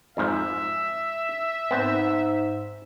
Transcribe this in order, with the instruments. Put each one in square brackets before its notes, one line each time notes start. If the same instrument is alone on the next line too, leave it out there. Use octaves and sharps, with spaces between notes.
[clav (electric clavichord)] F2 G#2 F3 [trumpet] E5
[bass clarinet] G#2 [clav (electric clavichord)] B3 C4